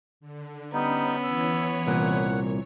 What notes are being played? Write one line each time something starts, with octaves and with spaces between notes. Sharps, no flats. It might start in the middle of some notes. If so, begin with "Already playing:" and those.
D3
G3 B3 C#4 D#4
E3 C#5 E6
C2 A#2 F#5